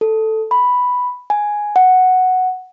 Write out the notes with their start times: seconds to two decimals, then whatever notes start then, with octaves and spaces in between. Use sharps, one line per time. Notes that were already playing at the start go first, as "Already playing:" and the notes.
0.01 A4
0.51 B5
1.30 G#5
1.76 F#5